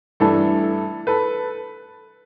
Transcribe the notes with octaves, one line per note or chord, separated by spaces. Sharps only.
G2 E3 A3 D4 A4
A4 B4